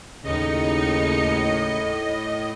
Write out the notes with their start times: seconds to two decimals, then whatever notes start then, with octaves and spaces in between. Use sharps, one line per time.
0.24 D#2 A2 C#3 D#4 D#5 C#7